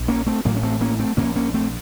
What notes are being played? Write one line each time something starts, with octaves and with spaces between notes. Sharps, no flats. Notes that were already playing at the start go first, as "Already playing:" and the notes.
Already playing: A#1
A#3 C#4
A3 C4
A1 A2 F#3 A#3
C#4
A3 C4
A#3 C#4
A3 C4
A#1 A2 A#3 C#4
A#3 C#4
A3 C4